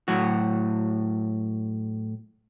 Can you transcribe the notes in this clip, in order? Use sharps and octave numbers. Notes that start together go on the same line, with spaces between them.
A2 F#3 F#4